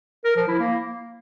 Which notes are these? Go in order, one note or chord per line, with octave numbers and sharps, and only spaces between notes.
A#4
F3
E4
A#3